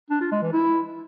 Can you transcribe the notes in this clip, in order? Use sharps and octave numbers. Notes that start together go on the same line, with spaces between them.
D4
F4
G#3
E3
E4